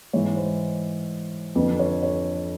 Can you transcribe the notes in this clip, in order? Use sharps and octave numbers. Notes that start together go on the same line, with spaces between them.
G#2 E3 C#5
C5
F2 D3 B4
C#5
C#5